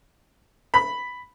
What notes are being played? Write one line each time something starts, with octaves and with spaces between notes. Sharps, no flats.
B5